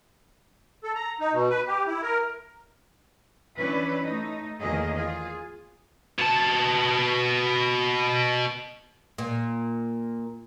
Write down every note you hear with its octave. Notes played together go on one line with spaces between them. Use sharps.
A4
A#5
D#4
B2
B4
G4
E4
A#4
E3 C#4 D4 B4
A3 D#4
E2 A2 D#3 A#3 G#4 D#5
F4 G#4
B2 A5
A#2